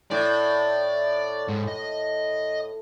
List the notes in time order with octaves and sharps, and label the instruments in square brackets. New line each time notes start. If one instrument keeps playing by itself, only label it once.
[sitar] A2 [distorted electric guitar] D5
[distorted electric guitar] G#2
D#5